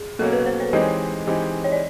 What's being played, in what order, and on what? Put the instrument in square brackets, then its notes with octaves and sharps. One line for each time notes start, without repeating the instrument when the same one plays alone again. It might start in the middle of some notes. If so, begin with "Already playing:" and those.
Already playing: [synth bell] G#4
[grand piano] B2 F#3 A#3 C#4 [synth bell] A4
[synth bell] B4
C5
C#5
[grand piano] E3 G#3 C4 D#4 G4 [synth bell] D#5
[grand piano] E3 G#3 C4 D#4 G4
[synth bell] C#5
D5